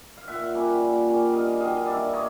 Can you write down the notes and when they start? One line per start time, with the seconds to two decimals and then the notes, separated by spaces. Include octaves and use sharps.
0.18 F5
0.28 A#2 E5 F#5
0.54 G3 A#3 C#4
0.81 A#2
1.08 G3 A#3 C#4
1.34 G2 D#5 F5
1.60 D#3 F#3 A#3 D#5 F5
1.75 F5
1.86 G2 D5 E5
2.13 A#3 C#5 D#5